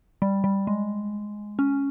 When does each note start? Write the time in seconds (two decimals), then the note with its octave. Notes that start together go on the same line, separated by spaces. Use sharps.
0.22 G3
0.44 G3
0.67 G#3
1.59 C#4